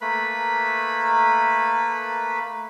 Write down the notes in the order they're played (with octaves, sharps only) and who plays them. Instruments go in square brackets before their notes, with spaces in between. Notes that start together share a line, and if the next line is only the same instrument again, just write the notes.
[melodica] A3 A#3 B4 B5